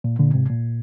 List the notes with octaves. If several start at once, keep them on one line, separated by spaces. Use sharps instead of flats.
A#2
A#2 D3
G#2 C3
A#2